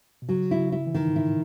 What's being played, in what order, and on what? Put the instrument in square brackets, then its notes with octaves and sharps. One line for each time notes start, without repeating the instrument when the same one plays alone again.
[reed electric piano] B2
[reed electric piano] C#3 [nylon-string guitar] F#3
[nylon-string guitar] E4
[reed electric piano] C#3
[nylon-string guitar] E4
[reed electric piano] E3
[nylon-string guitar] D#3
[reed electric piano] G#2
[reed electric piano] A2 [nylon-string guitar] E4